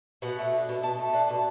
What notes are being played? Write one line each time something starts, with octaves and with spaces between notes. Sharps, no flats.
B2 F#5
A3
D4
B2
B2 A5
A3
D4 A5
B2